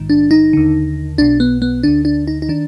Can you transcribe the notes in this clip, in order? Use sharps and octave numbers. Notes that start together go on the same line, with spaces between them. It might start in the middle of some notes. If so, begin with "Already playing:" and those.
Already playing: A#1 G#2 D#3
D4
D#4
D#2 D3
B1 B2 D4
B3
B3
D2 D3 D4
D4
D#4
D#4
D#3 D4